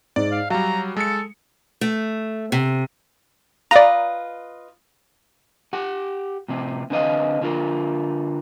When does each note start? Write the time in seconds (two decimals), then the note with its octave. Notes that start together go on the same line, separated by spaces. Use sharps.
0.16 G#2 D5
0.31 F5
0.50 F#3 G3 F5 A#5
0.97 G#3 A4 C#7
1.81 A3
2.52 C3
3.71 F4 B4 D5 D#5 A#5
5.73 G4 F#5
6.48 A2 C3 C4
6.90 D3 C4 B4 D#5 F5
7.41 D3 F4 A#4